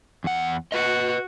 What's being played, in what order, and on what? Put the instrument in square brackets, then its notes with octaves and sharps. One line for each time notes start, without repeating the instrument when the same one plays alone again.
[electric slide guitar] E2 F#5
[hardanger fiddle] F#4 [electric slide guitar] B4 D#5